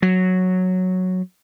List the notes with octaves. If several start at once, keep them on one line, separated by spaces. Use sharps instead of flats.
F#3